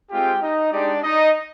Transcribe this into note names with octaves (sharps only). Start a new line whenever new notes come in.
G#3 C4 F4 G4 G5
D#4 D#5
G#3 D4 D#4 G4 D5
D#4 D#5